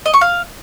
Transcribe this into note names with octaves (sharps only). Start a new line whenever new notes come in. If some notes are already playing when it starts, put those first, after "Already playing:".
D#5
C#6
F5